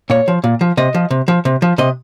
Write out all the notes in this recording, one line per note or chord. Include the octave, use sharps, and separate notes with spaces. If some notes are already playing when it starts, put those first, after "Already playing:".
A#2 C#5
F3
A#2
F3
C3 D#5
F3
C3
F3
C3
F3
C3 D#5